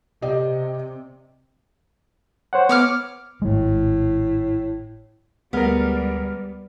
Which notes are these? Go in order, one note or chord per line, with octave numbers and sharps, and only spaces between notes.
C3 G4 D5 D#5
C5 C#5 F#5
B3 C#5 D6 F6
G#1 A2 G#3
D2 G3 G#3 B3 G#4 A#4 F6